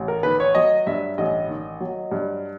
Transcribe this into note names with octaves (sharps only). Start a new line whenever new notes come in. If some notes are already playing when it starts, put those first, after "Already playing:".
Already playing: A1
A#4
D#3 B4
C#5
F#3 D#5
G2 E5
A1 D#5
D#3
F#3
G2